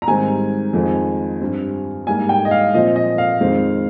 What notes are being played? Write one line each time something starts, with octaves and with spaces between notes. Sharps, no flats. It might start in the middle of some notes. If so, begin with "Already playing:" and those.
A#5
G#2 D#3 G3 C4 G#5
F2 D#3 G#3 C4
G2 G3 C4
G#2 G3 A#3 G#5
G5
D#5
F5
A#2 F3 C4 D#5
D#5
F5
F2 D#3 G#3 C4